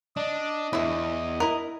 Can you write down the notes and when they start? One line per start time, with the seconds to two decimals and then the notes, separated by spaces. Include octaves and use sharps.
0.17 D4 D#5
0.73 E2 E4 E5
1.40 E4 A#4